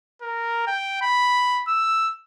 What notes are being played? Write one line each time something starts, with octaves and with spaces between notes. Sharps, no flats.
A#4
G5
B5
E6